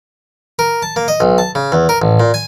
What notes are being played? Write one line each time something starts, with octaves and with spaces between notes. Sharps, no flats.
A#4
A5
A#3
D#5
B1
A5
C#3
E2
A#4
A1
A#2
G#5